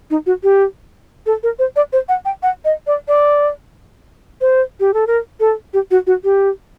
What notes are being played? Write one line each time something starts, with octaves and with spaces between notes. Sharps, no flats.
D#4
F#4
G4
A4
A#4
C5
D5
C5
F#5
G5
F#5
D#5
D5
D5
C5
G4
A4
A#4
A4
G4
F#4
F#4
G4